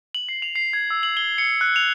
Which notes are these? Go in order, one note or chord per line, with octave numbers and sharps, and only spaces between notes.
F#7
C7
F7
C7
G#6
E6
F#7
G7
C#7
F#6
F7